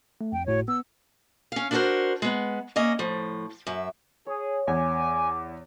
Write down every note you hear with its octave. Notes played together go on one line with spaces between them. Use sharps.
A3
F2 G5
G1 A2 F#4 C#5
B3 E6
C#4 F5
D4 E4 F#4 G#4 A#4 C5
G#3 B3
A#3 C#4 D#5
A2 F3
F#2 E5
G#4 C#5
E2 G#5 D6